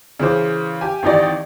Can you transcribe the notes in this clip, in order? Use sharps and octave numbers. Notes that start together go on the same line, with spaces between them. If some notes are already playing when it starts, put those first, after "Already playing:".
C#3 E3 C5 D6
G4 G#5
G#1 E3 D#4 G4 D5